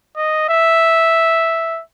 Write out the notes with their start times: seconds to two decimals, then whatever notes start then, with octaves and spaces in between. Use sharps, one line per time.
0.16 D#5
0.49 E5